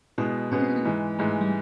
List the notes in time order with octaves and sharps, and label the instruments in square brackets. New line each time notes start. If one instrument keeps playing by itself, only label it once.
[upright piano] B2 G#3 B3 [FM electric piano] E4
[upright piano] B2 G#3 B3 [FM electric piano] C#4
[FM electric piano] C4
B3
A#3
[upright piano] G#2 E3 G#3
[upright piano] G#2 E3 G#3 [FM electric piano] A3
[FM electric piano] G3